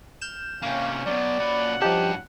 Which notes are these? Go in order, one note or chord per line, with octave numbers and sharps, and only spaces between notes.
F6 G6 E7
C3 A#3 C#4 F5
B2 F#3 D5
A#2 C#4 F#4 F#5 B5
G2 F3 D#4 G4 A5